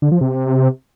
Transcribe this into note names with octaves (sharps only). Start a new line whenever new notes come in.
D3
F3
C3